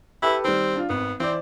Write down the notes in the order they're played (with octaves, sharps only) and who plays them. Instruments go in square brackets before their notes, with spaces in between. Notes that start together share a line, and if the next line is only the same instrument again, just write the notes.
[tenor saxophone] E4 [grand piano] G4 A4 B4
[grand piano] D#3 G3 [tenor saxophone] C4
[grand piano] D4 F4
[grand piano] G#1 [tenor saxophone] B3
[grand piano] E3 C5 D5 [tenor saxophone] C4